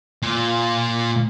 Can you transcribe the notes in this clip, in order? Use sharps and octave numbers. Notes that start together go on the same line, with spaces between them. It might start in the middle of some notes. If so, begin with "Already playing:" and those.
A#2 F4